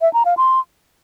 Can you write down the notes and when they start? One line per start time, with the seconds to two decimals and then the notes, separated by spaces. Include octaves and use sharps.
0.01 E5
0.13 A#5
0.25 F5
0.37 C6